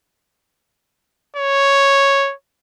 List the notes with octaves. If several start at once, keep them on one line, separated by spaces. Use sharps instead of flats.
C#5